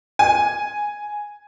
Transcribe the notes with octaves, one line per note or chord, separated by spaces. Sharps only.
G#5